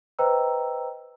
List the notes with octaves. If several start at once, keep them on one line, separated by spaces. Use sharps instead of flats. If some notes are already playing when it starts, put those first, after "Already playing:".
B4 C5 D#5 G5 A#5 E6